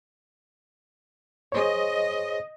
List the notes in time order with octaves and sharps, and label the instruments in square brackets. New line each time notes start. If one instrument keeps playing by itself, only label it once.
[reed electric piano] G#4 C5 C#5 [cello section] D#5